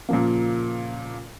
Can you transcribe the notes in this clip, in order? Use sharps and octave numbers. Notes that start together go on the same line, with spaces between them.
A#2 C#3 F3 A#3